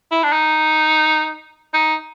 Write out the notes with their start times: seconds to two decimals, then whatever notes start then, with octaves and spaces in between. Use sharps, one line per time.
0.11 E4
0.23 D4
0.32 D#4
1.73 D#4